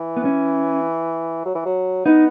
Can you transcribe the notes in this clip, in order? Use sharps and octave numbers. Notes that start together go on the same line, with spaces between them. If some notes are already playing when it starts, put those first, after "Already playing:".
Already playing: E3
B3
C#4
F#3
E3
F#3
B3 D#4